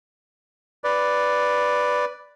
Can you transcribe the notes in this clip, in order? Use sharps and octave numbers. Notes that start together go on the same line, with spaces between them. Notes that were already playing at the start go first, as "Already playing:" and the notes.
B4 D5